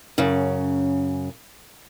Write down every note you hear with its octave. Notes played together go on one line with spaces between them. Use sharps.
F#2 C#3